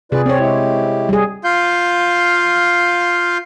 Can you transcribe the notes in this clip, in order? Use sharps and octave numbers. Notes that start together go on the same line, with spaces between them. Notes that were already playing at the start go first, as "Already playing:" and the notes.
C3 F4 G#4 B4 D5
C4 G#4 C#5 D5
G#3 E4 G4
G3 G#4
F4 F5 G6